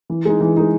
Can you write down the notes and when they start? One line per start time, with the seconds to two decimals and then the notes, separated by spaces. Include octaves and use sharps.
0.10 E3
0.25 G#3 D#4
0.41 E3
0.57 G#3 D#4